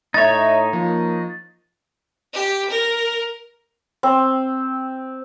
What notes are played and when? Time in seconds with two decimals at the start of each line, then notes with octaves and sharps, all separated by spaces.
0.14 A2 D#4 C#5 E5 A#5 A6
0.73 F3 A#3
2.34 G4
2.70 A#4
4.03 C4